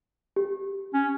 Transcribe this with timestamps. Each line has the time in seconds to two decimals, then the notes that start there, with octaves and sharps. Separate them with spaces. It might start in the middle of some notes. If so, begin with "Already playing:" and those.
0.36 G4
0.94 C#4